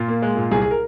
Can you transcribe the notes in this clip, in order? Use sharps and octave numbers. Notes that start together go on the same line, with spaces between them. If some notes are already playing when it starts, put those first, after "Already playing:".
Already playing: A#2 F4
A#3
G#3
A#2
C2 G#4
G#4
A#4